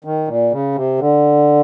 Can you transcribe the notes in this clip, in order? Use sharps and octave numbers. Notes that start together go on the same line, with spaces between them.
D#3
A#2
C#3
C3
D3